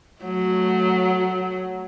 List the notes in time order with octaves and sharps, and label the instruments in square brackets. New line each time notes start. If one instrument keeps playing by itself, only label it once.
[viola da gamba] F#3 A3